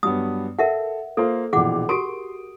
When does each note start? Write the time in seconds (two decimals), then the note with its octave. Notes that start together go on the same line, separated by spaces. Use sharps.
0.03 G2 F#3 B3 D#6
0.59 A4 A#4 E5 F#5
1.17 A#3 F4 A4 C5
1.53 A#1 B2 E3 G#4 F#5 D6
1.89 F#4 G4 A#4 C6 D#6 D7